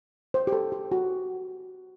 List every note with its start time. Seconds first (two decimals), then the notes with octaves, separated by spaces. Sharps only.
0.34 C5
0.47 G4
0.52 A4
0.72 G4
0.92 F#4